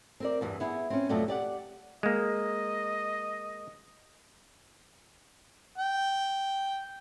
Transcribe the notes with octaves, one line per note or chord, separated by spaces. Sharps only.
C4 A#4 D5
E2 G2 E3
B3 E4 G#4
C4 C#4
F2 B2 F#3 A3 D5 G5
G4 D5 F#5
G#3 A#3 D#5
G5